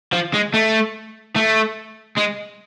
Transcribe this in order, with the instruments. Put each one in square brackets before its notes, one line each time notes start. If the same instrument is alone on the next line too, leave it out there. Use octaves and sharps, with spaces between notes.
[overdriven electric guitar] F3
G#3
A3
A3
G#3